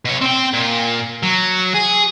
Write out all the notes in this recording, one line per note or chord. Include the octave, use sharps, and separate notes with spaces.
B2 C#5
C4 G5
A#2
F#3
G#4